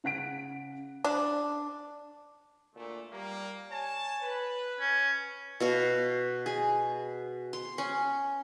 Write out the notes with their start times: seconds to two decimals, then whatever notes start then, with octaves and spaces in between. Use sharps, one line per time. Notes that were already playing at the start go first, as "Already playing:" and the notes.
0.04 C#3 F#5 B6 D7
1.04 D4
2.75 D2 A#2 A3
3.12 G3 A#3
3.71 C#5 G#5 A5
4.22 B4
4.80 C#4
5.60 B2 F#4 F5
6.46 G#4
7.53 C6
7.78 C#4